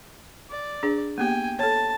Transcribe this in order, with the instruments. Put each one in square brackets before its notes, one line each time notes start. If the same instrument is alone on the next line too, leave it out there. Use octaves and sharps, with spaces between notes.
[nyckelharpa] D5
[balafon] D4 G#4
[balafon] A#3 B3 G4 [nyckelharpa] G5 G#5
[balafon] A4 C#5 [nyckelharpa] A5